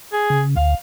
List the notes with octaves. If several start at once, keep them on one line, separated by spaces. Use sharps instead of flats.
G#4
C#3
D2 F5